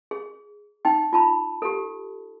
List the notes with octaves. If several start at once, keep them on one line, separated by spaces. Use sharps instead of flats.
G#4
D#4 G5
F4 A5 B5
G4 A4